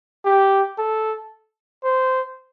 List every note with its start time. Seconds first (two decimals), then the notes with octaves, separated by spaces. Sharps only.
0.25 G4
0.78 A4
1.84 C5